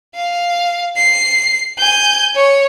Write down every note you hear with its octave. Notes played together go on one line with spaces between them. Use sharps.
F5
C7
G#5 G6
C#5